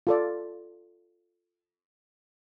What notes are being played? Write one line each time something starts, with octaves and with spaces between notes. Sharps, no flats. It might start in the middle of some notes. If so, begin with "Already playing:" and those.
F4 A4 D5